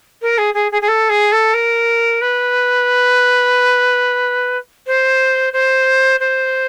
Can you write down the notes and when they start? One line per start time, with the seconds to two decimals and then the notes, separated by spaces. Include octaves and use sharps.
0.21 A#4
0.38 G#4
0.54 G#4
0.71 G#4
0.81 G#4
0.88 A4
1.09 G#4
1.32 A4
1.53 A#4
2.21 B4
4.86 C5
5.53 C5
6.20 C5